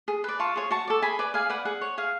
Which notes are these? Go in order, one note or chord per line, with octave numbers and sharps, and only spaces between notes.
G#4
B4 D5
F4 A5 C#6
G#4 C#5
F#4 A5 C#6
A4 D5
G#4 G#5 B5
B4 D5
G#4 F5 G#5
B4 D5 F#5
G#4 F#5
C#5
G#4 F5